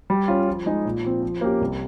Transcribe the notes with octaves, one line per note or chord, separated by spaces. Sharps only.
G3
C#4 F4
F3
G#3 D#4 G#4
A#2
F3 C4
F3
A#3 C#4 G4
C2